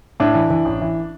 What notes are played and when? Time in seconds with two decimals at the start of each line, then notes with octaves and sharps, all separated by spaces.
0.20 A2 D4
0.35 E3
0.50 E3
0.65 A1
0.81 E3